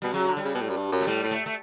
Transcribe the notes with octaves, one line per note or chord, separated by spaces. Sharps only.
B2 G3
C#3 F#3
D3
G3
C#3
B2
A2
F#2
G2
F#2
A3
A2 G3
A2
A3
A3